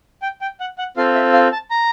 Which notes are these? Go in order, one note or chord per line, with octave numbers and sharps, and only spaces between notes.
G5
G5
F#5
F#5
C4 F4 A4 F5
E5
F5
A5
A#5